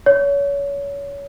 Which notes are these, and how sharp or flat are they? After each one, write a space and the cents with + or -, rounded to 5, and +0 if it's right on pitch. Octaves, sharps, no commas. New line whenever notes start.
C#5 +30